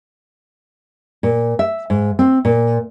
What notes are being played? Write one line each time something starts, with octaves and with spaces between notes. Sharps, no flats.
A#2
E5
G#2
C4
A#2